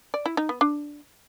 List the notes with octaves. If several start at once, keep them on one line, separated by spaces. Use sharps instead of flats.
D5
E4
D#4
B3
D4